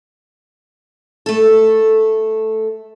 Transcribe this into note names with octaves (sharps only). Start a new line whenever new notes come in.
A3 A4